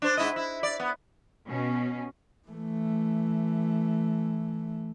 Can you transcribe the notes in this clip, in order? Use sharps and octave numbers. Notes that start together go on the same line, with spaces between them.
D4 C5
G#2 E4 D#5
E4
D5
B3
B2 C#4
E3 A3